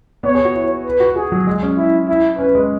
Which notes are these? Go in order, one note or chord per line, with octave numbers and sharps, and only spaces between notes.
B3 C#5
G#4
F#4
E4
B4
F#4
F#4 G#4
F#3
G#3
C#4
E4
E4
C#4 B4
G#3